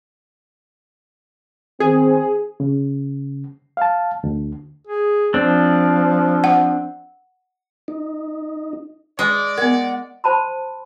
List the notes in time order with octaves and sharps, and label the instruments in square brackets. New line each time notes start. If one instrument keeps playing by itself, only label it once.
[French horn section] D#3 C4 [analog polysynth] G#4
[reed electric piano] C#3
F5 A5
D2
[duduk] G#4
[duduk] F3 [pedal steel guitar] C4 D4
[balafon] F#5
[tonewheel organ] D#4
[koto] G#3 [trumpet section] D5
[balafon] B3 A#4 [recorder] F#5
[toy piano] C5 A5 B5 C6